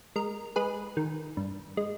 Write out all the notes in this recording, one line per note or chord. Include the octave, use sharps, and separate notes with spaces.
G#3 A#4
G#3 G#4 B4
D#3
G2
G#3